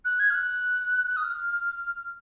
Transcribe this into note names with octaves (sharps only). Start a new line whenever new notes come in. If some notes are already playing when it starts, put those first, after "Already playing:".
F#6
G#6
F6
F#6
D#6
F6